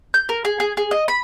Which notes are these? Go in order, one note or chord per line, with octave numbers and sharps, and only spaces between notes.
G6
A#4
G#4
G#4
G#4
D#5
B5